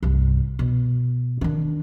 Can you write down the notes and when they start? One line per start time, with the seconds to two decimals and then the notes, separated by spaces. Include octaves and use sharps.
0.03 C2 G2
0.59 B2
1.41 D#3 D4